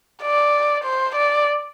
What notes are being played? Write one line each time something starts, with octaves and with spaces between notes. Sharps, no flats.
D5
C5
D5